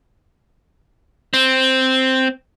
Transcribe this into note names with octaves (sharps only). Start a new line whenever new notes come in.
C4